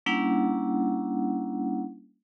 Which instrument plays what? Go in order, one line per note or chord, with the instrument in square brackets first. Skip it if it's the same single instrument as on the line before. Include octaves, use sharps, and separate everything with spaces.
[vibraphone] G3 A#3 C#4 D4 E4 F#5